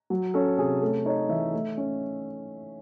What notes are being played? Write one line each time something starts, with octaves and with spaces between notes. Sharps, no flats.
F#3
C#4 A4
C3 G#4
A3 A4
D#4 C#5
E3 E5
A3
C#4